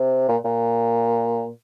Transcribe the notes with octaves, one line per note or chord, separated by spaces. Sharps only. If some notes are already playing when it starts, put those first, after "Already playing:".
Already playing: C3
A#2
A#2